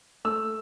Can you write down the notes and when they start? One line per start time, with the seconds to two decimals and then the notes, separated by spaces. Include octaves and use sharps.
0.25 A3 E6